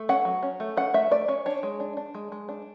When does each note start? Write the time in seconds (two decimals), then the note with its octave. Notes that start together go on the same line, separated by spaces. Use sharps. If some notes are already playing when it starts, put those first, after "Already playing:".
Already playing: A3
0.09 C#4 F#5
0.25 F#3
0.43 C#4
0.60 A3
0.77 C#4 F#5
0.94 A3 E5
1.11 A3 D5
1.28 C#4 C#5
1.46 D4 C#5
1.63 G#3
1.80 D4
1.97 D4
2.14 G#3
2.32 G#3
2.49 D4